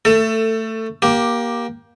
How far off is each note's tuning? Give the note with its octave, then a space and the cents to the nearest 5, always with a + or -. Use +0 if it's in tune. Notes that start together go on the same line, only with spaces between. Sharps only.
A3 +15 A4 +25
A#3 +20 G4 +0